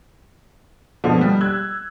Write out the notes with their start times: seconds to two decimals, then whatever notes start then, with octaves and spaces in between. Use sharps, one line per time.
1.04 B2 D3 F3
1.21 G3
1.41 E6 F#6 G#6